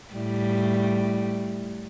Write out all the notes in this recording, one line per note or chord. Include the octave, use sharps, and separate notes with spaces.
A2 G3